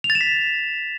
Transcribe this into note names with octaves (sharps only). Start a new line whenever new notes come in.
F7
A6
E7
B6